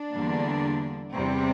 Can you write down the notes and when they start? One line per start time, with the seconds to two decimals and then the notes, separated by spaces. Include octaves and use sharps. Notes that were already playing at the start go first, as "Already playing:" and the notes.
Already playing: D4
0.14 E2 D3 G3 A#3
1.12 E2 C3 G3 C4